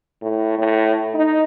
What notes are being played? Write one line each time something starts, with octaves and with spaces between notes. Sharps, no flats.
A2
A2
D#4